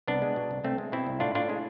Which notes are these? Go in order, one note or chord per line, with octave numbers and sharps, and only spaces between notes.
C2 B3 D4
G#3
B2
C2
C2 A3 C4
G#3
B2 C4 E4
C2
A2 D4 F4
A2 D4 F4
G#3